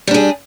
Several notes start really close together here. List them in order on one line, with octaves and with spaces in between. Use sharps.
G3 D4 G#4